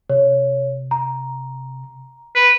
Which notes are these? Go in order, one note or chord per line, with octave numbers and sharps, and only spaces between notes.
C3 C#5
A#5
B4